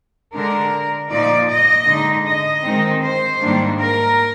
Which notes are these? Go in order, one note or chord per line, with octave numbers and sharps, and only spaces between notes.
D3 G#3 D4 A#4
A#2 F3 A#3 D#4 D5
D#5
D3 G#3 D#4
D#5
D#3 G#3 C4 D#4
C5
G#2 D#3 G3 A#3 D4
A#4